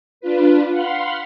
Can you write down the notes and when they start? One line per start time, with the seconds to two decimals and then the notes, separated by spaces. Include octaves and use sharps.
0.21 D4 F4 B4
0.70 F5 F#5 B5 C6